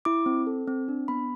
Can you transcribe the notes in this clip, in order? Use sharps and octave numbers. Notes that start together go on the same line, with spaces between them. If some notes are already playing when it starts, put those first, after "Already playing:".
E4 D6
C4
A4
C4
D4
B3 B5